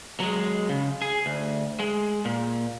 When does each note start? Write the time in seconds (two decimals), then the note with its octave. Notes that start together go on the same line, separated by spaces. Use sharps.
0.20 F#3 G#3
0.69 C#3
1.02 G#4
1.26 D2
1.80 G#3
2.25 A#2